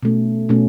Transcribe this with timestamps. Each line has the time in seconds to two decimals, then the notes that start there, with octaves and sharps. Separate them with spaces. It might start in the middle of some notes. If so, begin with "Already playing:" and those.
0.03 B2 A3 C#4
0.49 B2 A3 C#4